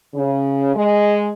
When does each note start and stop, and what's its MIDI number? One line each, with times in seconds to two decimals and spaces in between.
0.15 0.73 49
0.75 1.30 56